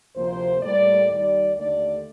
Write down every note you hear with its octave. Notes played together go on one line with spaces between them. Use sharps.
D2 C3 F3 A#3 C5
A2 G3 A#3 D5
D#2 D#3 G3 D5
D#2 D3 A3 D5